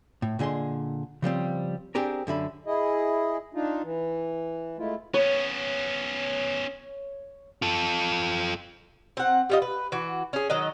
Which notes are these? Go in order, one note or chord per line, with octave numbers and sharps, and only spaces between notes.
A2
A#2 D3 G#4 D#5 C6
C#3 F3 G3 C4
C4 D4 G4 G#4 A#4
F#2 D3 E5 B5
E4 G#4 D#5
D4 D#4 F4
E3
G#3 A3 E4 F4
B3 C#4 C#5
F4 A4
C4 F#5
G3 F4 D#5
B4
E3 F#4
C#4 G#4
D#3 F#3 D#5